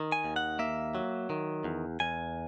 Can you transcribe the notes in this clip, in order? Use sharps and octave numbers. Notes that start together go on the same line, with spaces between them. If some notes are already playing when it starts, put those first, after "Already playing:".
Already playing: D#3
G#5
D#2
F#5
A#3 E5
F#3
D#3
E2
E2 G#5